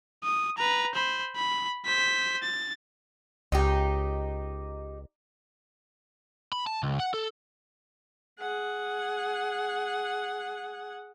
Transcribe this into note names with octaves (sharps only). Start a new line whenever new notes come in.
D#6
B4 A#5
C5 B5
B5
C5 B6
A6
C#2 D#4 G4
B5
A5
C#2
F#5
A4
G#4 F#5